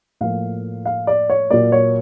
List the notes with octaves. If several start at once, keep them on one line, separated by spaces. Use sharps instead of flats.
A2 F3 A#3 F5
F5
D5
C#5
A#2 F#3 A#3 D5
C#5